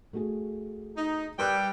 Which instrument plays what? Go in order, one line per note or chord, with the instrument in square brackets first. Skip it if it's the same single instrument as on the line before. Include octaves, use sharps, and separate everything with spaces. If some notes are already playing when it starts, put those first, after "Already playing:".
[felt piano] A3 F#4 G#4
[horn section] D#4
[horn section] G3 G5 [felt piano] B4 E6 F#6